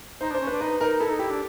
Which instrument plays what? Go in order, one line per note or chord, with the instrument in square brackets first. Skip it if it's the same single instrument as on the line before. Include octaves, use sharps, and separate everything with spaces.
[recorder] D#4 [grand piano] C5
[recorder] D4 [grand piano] C5
[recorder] C#4
[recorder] D4 [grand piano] B4
[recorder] D#4 [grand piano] B4
[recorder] D#4 [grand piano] A#4
[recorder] E4 [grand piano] A4
[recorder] D#4
[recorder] E4 [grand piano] G4
[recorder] D4